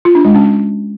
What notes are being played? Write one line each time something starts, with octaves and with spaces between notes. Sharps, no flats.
F4
D4
G#3
C#4